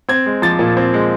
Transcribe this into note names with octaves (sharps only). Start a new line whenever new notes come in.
C4 G#6
G#3
F3 A6
A#2
C4
G#3